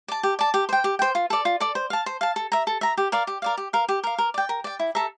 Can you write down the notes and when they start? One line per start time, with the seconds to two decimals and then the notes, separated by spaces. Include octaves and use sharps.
0.08 D5 A5
0.23 G4
0.39 D5 A5
0.54 G4
0.69 C5 G5
0.84 G4
0.99 C5 G5
1.15 F4
1.30 A4 D5
1.45 F4
1.60 A4 D5
1.75 C5
1.90 F5 A5
2.06 C5
2.21 F5 A5
2.36 A4
2.52 E5 A#5
2.67 A4
2.81 E5 A#5
2.97 G4
3.12 A#4 D5 F5
3.27 G4
3.42 A#4 D5 F5
3.57 G4
3.73 A#4 F5
3.89 G4
4.04 A#4 F5
4.18 A#4
4.34 D5 G5
4.49 A#4
4.64 D5 G5
4.79 E4
4.95 A4 E5 A#5